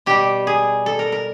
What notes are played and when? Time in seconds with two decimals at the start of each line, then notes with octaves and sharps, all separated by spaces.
0.06 B2 G3 G4
0.47 G#4
0.86 A4
0.99 A#4
1.12 A#4